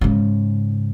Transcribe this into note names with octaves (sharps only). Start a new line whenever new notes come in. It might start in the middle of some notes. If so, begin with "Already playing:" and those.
G#2 C#3